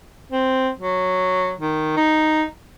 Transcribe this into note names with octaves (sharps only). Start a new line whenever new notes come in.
C4
F#3
D#3
D#4